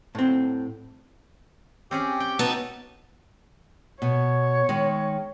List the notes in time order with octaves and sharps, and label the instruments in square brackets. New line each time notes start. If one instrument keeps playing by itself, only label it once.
[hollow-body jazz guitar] A2 C4
[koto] C4 C#4 G#4 [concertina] G4
[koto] G5
[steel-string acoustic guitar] B3 D#4 F#4 [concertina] A5 E6
[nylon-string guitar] B2 [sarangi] C#5
[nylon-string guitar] D#3 G#3